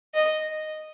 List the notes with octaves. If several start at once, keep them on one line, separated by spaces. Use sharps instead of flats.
D#5